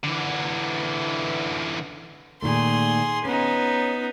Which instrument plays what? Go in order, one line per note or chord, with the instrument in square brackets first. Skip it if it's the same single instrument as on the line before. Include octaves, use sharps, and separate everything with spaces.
[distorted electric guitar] D3 E3
[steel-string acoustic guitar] A#2 D#3 A3 [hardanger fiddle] G#4 C6
[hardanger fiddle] B3 D#4 [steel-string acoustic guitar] C#4